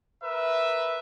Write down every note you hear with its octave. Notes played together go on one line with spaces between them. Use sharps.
A#4 B4 E5